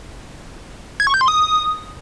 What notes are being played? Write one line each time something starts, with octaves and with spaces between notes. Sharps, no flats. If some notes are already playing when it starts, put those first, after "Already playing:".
G#6
C#6
G6
C6
D#6